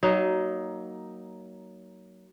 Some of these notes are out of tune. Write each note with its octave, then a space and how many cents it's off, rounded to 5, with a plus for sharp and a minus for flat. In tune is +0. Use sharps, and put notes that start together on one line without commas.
F#3 +20 A#3 +0 D#4 +0